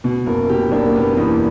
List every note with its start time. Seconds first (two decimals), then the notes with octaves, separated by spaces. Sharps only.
0.04 B2
0.26 F#1 A#4
0.49 B2 G4
0.72 F#1 D4
0.85 A#3
0.94 B2 B3
1.17 E2 A#3